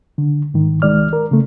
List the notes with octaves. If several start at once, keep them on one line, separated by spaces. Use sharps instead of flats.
D3
G#2 D#3
C2 D#3 G#3 D5 F6
A#4
C#3 A3